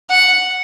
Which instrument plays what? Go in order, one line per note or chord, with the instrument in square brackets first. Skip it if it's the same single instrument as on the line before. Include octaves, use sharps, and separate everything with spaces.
[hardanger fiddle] F#5